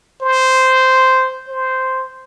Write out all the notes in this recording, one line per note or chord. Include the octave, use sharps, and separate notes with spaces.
C5
C5